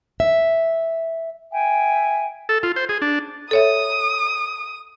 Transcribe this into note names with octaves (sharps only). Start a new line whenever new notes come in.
E5
E5 G5 G#5
A4
F4
C5
G#4
D4
A4 C#5 E5 D#6